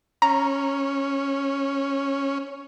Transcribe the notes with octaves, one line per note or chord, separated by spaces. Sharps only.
C#4 A#5